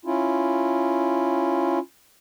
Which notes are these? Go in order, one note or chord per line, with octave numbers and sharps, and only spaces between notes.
C#4 E4 F4